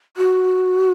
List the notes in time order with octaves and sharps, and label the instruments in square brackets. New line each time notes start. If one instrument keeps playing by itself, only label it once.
[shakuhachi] F#4